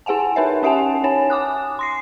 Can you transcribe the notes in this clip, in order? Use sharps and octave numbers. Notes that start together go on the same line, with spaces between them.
E4 G#4 F#5 G#5 A5
D#4 A#4 B4 C#5 E5
C#4 G4 E5 F#5 G#5 A5
D#4 C#5 G#5
G#5 D6 D#6 F#6
C6 A#6 C7